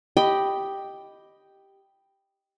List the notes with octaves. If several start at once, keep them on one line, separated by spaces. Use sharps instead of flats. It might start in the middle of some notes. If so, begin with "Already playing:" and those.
G4 D#5 G5 B5